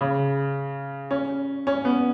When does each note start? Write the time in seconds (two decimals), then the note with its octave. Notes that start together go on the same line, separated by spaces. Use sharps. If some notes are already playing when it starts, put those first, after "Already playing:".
0.01 C#3
1.11 C#4
1.67 C#4
1.85 B3